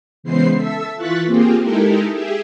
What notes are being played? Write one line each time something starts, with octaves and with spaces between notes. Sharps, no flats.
C#3 E3 G#3 B3 C5 C7
A4 E5 E6
E3 F4 C#6 F#6 A6 B6
A#3 C4 F4 G4 G#4
G#3 D#4 E4 G4 A4 A#4
G4 G#4 E5